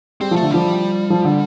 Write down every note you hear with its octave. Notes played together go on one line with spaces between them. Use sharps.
G3 C4
F3 A3
D3
F3 G3
F3
D3